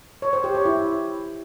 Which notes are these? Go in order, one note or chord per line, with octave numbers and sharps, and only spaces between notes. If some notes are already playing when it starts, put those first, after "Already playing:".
C#5
C5
G4
C#5
E4